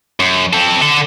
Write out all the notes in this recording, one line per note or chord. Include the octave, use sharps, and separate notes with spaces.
F#2
C4 A4
D3 A4